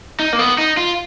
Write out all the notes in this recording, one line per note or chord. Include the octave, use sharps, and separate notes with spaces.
D#4
A#3
B3
D#4
F4